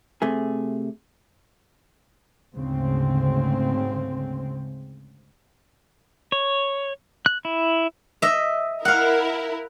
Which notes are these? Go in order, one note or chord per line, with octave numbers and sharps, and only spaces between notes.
C3 A3 G#4
D2 G#2 C#3 C4
C#5
F#6
E4
D#5 E5
E4 A#4 F5 F#5